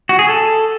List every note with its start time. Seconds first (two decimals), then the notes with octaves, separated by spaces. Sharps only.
0.09 F#4
0.19 G#4
0.28 A4